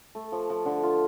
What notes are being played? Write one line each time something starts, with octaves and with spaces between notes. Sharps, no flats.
A3
F3
F3
D3
F4